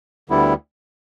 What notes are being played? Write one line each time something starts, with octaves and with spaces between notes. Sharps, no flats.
D2 D3 G3 B3 E4